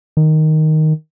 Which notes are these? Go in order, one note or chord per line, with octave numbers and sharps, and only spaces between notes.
D#3